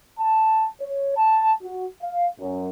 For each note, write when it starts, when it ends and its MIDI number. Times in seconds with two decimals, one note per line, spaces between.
0.19 0.66 81
0.82 1.14 73
1.16 1.52 81
1.62 1.88 66
2.02 2.27 77
2.40 2.69 42